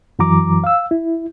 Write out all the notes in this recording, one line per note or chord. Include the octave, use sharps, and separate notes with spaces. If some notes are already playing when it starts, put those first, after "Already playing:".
F#2 E3 F#3 A#5 D6
F5 E6
E4